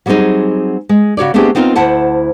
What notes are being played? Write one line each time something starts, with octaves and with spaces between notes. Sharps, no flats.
F#3 G3 B3 C4 D#4 G#4
G#3
C#3 F#4 C#5 D5
A3 B3 C4 D4 G4 G#4
B3 C4 D#4 F4 A#4
D2 E4 C5 F#5 A5